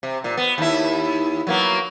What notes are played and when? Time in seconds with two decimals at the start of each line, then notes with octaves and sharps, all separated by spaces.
0.03 C3
0.24 A#2
0.37 B3
0.58 D#2 E4
1.47 F#3 A#3 B3